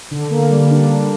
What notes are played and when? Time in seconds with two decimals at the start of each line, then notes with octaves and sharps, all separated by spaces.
0.11 D3
0.31 A#3
0.50 G3
0.71 D4
0.90 D3